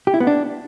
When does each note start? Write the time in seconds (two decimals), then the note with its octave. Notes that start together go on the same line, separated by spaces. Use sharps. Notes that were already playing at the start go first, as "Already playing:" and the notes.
0.07 G4
0.14 E4
0.20 B3
0.27 D4